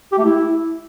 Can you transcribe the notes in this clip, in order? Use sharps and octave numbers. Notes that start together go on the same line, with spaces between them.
G4
A3
E4